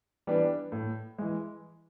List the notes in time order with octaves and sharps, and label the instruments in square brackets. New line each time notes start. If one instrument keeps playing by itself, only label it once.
[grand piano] E3 G3 B3 D4
A2
E3 G#3